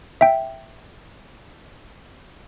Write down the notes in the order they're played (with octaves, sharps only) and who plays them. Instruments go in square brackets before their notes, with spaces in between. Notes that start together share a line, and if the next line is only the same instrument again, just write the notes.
[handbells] E5 G5